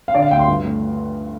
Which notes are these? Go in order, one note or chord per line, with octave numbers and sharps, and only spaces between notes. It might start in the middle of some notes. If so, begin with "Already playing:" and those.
F5
D3 D5
F5
D2 G5
C6
G2
A3